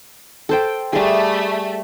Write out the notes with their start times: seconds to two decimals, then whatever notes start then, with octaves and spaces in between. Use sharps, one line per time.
0.49 A4 C5 G5
0.93 G3 A3 G#4